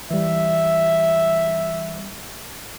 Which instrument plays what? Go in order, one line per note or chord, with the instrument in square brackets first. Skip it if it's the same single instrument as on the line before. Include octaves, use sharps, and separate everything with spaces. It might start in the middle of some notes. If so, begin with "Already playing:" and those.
[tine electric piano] E3 G3 [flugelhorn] E5